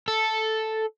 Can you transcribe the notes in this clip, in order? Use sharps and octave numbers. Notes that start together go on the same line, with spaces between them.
A4